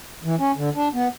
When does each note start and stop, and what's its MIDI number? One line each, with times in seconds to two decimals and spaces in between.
0.25 0.35 52
0.40 0.52 61
0.57 0.69 50
0.75 0.88 62
0.94 1.08 59